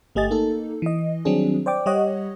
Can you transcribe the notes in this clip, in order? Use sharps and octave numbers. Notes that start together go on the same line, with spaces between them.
G1 A3 G4 D#5 G#5 A6
A#3 D#4 A4
E3 D#5
D#3 F#3 G3 C4 D4 G#4
C5 D5 G5 D6
G3 G4 C#5 D#5 F#5